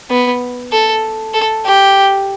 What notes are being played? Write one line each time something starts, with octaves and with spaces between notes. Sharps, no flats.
B3
A4
A4
G4